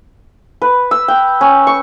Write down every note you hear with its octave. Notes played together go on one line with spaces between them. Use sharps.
B4
E6
G5
C#4
C#6